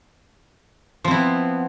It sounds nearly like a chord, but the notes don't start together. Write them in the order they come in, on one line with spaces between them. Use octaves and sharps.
F3 C4 E4 B3